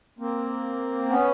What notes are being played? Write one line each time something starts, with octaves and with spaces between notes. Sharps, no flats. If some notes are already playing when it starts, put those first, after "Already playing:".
A#3 C4
B3 C#4